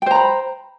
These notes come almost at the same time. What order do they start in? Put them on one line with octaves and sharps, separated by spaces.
G5 C5 A#5 B5